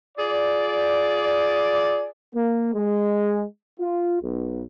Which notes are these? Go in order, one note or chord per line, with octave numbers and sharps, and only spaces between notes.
F4 G#4 D5
A#3
G#3
F4
B1